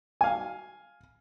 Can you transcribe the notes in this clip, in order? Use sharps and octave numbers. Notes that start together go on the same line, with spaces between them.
F5 G#5